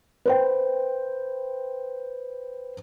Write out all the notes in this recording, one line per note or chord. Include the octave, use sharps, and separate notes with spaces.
B4 C5 G5